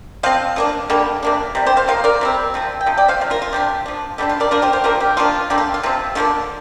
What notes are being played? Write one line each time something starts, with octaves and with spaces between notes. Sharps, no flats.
F3 C4 C5 F5
F3 A#3 D4
D3 G3 A#3
C3 A#3 D4
C3 G3
G4 C5
C5 F5
F3 A#3 F5
A#4 D5
C3 G3 C4
C3 F3 C4
G5
C3 F3
D5 G5
C5 F5
C3 F3
F4 A#4
F4
C3 F3 D4 G4
F3 D4
D3 G3 A#3 D4 G4
F4
A#4 D5
F3 A#3 D4 F4 A#4
G4 C5
G4 C5
D3 F3 A#3 D4 F4 A#4
G4
F3 A#3 D4 F4
D3 A#3 D4 G4
F4
F4
C3 F3 C4
D3 F3 A#3 D4 F4